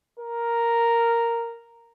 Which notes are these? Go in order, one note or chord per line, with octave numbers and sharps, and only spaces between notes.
A#4